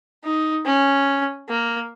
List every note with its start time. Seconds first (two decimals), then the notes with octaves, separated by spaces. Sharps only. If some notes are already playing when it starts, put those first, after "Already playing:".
0.24 D#4
0.66 C#4
1.49 A#3